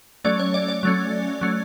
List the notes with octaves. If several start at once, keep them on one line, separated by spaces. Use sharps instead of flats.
F#3 A3 C#4 D5
C#5
D5
D5
F#3 A3 C#4
F#3 A3 C#4